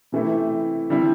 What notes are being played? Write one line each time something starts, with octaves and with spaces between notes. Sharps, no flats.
C3 E3 A3 C4 E4
D3 G3 C4 E4 A4